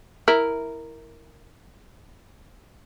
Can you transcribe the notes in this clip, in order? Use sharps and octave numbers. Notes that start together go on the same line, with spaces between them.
E4 A#4